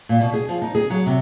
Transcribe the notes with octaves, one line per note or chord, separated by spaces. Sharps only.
A#2
B2
G#4
F3
D#4
G#4
F#3
C3